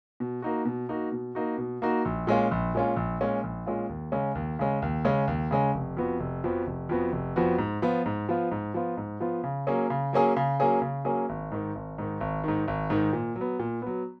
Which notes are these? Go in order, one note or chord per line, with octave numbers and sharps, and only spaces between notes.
B2
A#3 D#4 F#4
B2
A#3 D#4 F#4
B2
A#3 D#4 F#4
B2
A#3 D#4 F#4
A#1
A#2 G#3 C#4 F4
A#1
A#2 G#3 C#4 F4
A#1
A#2 G#3 C#4 F4
A#1
A#2 G#3 C#4 F4
D#2
C#3 G#3 C#4
D#2
C#3 G#3 C#4
D#2
C#3 G#3 C#4
D#2
C#3 G#3 C#4
F1
F2 F3 B3 F#4
F1
F2 F3 B3 F#4
F1
F2 F3 B3 F#4
F1
F2 F3 B3 F#4
G#2
F3 B3 F4
G#2
F3 B3 F4
G#2
F3 B3 F4
G#2
F3 B3 F4
C#3
F#3 A#3 C#4 G#4
C#3
F#3 A#3 C#4 G#4
C#3
F#3 A#3 C#4 G#4
C#3
F#3 A#3 C#4 G#4
G#1
G#2 D#3
G#1
G#2 D#3
G#1
G#2 D#3
G#1
G#2 D#3
A#2
F#3
B3
A#2
F#3 B3